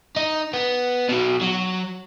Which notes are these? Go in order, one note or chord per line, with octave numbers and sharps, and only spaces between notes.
D#4
B3
B2 F#3
F#3